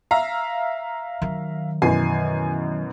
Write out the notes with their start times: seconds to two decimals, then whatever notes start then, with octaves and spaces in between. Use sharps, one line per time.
0.11 E5 F5 A#5
1.22 D#3 F#3
1.82 F#2 B2 E3 G#5 C7